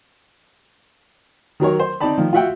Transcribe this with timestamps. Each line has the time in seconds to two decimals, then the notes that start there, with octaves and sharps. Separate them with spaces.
1.60 D#3 F#3 A#4 C#5
1.79 C5
2.01 C4 D#4 D5 A5 B5
2.18 D#3 F3
2.33 F4 F#4 E5 F#5 G5